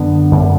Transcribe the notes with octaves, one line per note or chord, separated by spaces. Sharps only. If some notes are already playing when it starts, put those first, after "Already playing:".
Already playing: F#2 D3 B3
F#2 D3